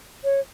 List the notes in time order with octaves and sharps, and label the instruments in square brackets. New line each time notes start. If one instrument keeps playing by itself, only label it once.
[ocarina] C#5